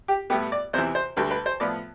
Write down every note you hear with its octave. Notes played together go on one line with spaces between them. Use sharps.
G4
A2 G3 B3 G4
D5
E2 C3 E3 C5
C5
D2 D3 G3 B4
B4
C5
A2 F3 B3 D5